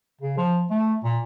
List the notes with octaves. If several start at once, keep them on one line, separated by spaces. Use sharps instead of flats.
C#3
F3
A3
A#2